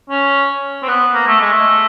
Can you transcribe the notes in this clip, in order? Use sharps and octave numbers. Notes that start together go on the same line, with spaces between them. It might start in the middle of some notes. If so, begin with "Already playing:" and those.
C#4
C4
B3
A#3
A3
G#3
A3